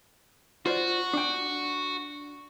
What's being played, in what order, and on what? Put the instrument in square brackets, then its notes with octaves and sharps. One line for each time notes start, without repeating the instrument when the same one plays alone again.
[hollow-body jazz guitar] F4 C5 D5 [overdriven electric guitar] F#4
[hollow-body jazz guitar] D4 G5